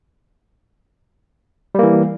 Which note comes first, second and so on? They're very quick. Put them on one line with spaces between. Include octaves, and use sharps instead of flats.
G3 A#3 E3